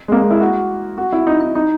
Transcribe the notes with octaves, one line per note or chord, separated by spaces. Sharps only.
G#3
A#3
G#3
E4
F#4
F#4
E4
D#4
D#4
D#4